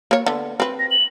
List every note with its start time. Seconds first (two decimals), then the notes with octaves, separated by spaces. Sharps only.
0.11 A#3 C#5
0.26 D3 B3
0.60 C4 B4
0.79 A#6
0.91 F#7